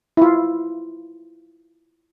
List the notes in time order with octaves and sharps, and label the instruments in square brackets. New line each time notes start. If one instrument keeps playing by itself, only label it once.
[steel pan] E4 F4